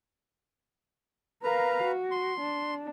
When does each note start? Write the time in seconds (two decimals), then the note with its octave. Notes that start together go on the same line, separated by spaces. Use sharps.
1.43 A#4 B4 F5 A#5
1.83 F#4
2.11 C6
2.40 D4